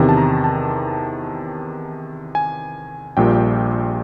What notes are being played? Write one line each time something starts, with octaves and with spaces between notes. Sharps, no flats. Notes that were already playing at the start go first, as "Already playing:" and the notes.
Already playing: E2 C3 D#3
A5
A#5
A5
G#5
A#1 A#2 G3 G5